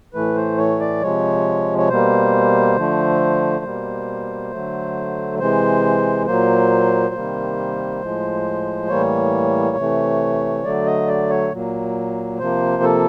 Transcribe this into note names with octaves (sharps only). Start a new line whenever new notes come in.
A2 E3 A3 B4
C5
C#5
D5
C3 F3 G#3 C#5
C#5
B2 G3 A#3 C5
D3 F3 A3
B2 G3 A#3
D3 F#3 A3
C3 E3 G#3 C5
A#2 F#3 A#3 C5
C3 D#3 G3 A#3
A2 F3 G#3
A2 E3 G3 A#3 C#5
C3 E3 A3
D3 F#3 A3 D5
D#5
D5
C#5
A#2 F#3 A#3
C3 F3 A#3 C5
A4